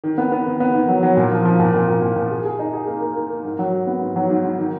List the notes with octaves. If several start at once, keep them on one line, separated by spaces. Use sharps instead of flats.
D#3
B3
B3
D#3
B3
D#3
F#3
F#3
A#2
F3
F3
A#2
A#2
A#2
A#2
A#2
G#4
G#4
D#4
G#4
A#3
A#3
A#3
A#3
G#2
F#3
G#2
B3
G#2
F#3
G#2
G#2
D#3